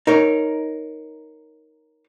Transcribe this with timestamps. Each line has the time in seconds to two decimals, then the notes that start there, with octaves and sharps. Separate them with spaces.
0.07 D#4 A#4 C#5